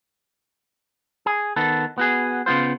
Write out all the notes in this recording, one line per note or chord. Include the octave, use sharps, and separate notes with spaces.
G#4
D#3 B3 A4
B3 F#4 G#4
C#3 B3 F4 C5